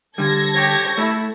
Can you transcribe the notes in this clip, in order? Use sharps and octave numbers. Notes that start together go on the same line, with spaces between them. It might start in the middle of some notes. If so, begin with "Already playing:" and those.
D3 G3 A4 G#6 A#6
G4 C#5
A3 E4 A4